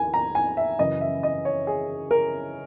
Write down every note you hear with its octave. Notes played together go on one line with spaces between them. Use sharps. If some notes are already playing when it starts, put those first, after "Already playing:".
Already playing: D#2 G#5
A#5
G#5
E5
F#2 C#3 E3 D#5
E5
D#5
C#5
G#4
A#4